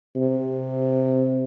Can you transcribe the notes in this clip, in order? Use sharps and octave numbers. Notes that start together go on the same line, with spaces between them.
C3